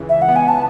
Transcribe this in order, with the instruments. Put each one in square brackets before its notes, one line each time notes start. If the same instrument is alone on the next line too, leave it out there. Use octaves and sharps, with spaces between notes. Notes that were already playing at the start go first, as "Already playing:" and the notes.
Already playing: [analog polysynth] C#2 C#3 E3
[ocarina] E5
F#5
[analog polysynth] B3
[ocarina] G#5
A5